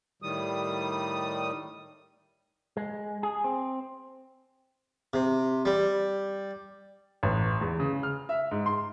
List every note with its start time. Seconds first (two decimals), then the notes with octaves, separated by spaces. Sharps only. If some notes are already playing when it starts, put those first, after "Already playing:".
0.22 A2 D#3 G3 D#6
2.77 G#3
3.23 G#4
3.44 C4
5.13 C3
5.65 G3
7.23 A1
7.61 E2
7.80 C#3
8.03 F6
8.29 E5
8.51 G#2
8.66 C6